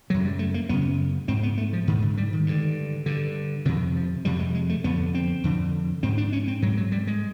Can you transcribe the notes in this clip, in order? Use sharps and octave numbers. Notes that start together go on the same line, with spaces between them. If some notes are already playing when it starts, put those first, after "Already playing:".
F#2 C#3 F#3
G3
A3
A#3
F#2 C#3 B3
G#2 C4
B3
A3
F3
G#2 D#3
D3
G3
D#3
G2 D3
G2 D3
F2 C3 D#3
F3
F2 C3 G3
G#3
G#3
A3
F2 D3 B3
C4
F2 D3
G#2 C4
D4
C#4
C4
G#2 F#3
F#3
G3
G#3